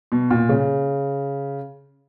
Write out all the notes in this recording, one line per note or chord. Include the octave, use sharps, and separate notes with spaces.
B2
A#2
C#3